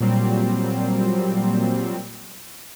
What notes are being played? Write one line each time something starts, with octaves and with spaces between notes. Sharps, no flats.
A#2 F#3 G3 C4